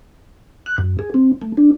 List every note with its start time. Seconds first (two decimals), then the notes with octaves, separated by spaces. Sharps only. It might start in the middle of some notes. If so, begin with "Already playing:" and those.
0.66 F#6
0.78 F#2
0.99 G#4
1.14 C4
1.42 A3
1.57 D4